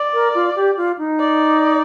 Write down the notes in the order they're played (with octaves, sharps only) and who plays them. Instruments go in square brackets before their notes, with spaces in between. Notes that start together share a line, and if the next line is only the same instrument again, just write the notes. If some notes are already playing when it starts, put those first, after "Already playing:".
Already playing: [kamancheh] D5
[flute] A#4
F4
G4
F4
D#4
[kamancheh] D5